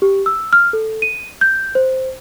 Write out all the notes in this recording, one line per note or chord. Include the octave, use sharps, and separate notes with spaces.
G4
E6
F6
A4
D#7
G6
C5